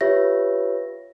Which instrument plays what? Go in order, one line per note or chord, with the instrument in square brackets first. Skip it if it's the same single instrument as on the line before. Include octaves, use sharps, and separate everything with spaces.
[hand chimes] F4 G4 B4 C#5 E5 A#6